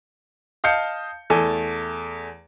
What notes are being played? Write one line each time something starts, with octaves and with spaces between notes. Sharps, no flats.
D#5 F5 A5 G6 C#7
E2 A3 A4 G#5